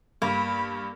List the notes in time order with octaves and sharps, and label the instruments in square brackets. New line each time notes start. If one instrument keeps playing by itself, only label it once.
[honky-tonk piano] G2 [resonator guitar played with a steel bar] A#3 [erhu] B5